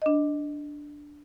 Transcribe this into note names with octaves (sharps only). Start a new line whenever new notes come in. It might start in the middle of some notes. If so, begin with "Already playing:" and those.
D4 D#5